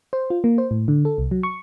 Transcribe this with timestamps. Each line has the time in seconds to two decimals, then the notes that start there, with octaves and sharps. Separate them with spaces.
0.13 C5
0.30 F4
0.44 A#3
0.58 C5
0.71 A2
0.88 D3
1.05 A4
1.18 C2
1.31 F#3
1.43 C#6